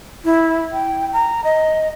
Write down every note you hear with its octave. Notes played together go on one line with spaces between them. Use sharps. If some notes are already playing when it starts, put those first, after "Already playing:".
E4
G5
A#5
D#5